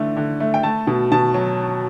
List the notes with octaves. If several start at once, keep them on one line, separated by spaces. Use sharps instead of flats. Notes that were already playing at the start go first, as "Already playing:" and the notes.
Already playing: D3 E3 A3
D3
A3
G5
A3 A5
B2
B2 A5
F#3